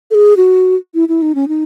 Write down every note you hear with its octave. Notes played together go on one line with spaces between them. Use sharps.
A4
G#4
F#4
E4
E4
D#4
C#4
D#4